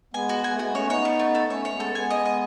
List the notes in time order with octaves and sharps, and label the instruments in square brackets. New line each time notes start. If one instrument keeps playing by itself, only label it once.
[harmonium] G#3 B3 [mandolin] G#5
[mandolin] F#4
[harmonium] G#3 [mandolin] G#5
[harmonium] A3
[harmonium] G#3 B3 [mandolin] F#4
[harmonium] A3 C#4 [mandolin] C#5
[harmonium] B3 D#4 [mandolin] C#5
[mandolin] A3
A3
A4
[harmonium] A3 C#4 [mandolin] C#5
[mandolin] C#5
[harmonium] G#3 B3
[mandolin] A4
[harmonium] G#3 B3 [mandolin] G#5
[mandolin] D#5
D#5